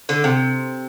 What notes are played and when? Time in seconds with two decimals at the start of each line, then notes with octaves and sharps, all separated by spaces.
0.09 D3
0.24 C3